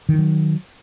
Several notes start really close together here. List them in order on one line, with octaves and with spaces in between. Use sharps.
D#3 E3 F#3